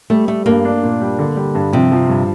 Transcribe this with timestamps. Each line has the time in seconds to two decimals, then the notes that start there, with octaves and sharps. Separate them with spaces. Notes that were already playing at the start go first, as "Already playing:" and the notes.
0.10 G3 A3
0.28 G3 A3
0.46 G2 A#3
0.65 D4
0.83 A#2
1.01 G3
1.19 D3
1.36 G3
1.55 G2
1.73 C3 F3
1.92 F3
2.09 G2